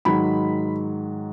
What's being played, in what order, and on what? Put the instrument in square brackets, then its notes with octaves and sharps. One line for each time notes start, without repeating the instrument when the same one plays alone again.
[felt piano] G#2 D#3 F#3 B5